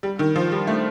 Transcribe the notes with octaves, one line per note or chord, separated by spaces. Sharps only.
G3
D#3
F3
G3
A3